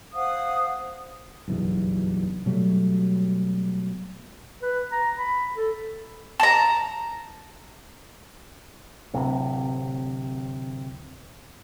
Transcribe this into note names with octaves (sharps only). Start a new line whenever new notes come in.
C5 F5 F#5 D#6
F#1 B1 E2 G2
B2 F#3 G3 A3
B4
A#5
B5
A4
A5 A#5
D1 C3